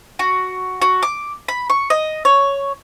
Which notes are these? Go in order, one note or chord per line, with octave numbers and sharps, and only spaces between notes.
F#4
F#4
D6
B5
C#6
D#5
C#5